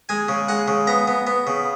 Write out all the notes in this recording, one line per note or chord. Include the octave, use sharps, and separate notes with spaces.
G#3 G#5
C#3
G#3 F#5
C#3
B3 A#5
B3
B3
C#3